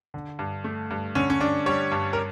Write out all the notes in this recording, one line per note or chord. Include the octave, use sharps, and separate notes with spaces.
D3
G2
A3
G2
D3 C#4
C#4
G2 D4
G3 C#5
G2
A#4